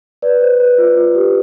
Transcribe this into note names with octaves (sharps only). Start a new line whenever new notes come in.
B4 D5
C5
B4
F4
F4
G4